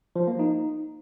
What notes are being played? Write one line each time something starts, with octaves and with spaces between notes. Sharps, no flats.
F3
A#3
D#4